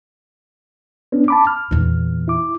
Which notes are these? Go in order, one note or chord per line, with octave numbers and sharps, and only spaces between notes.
B3 C#4 D4
A5 B5 D6
F6
E2 A#2
E4 D6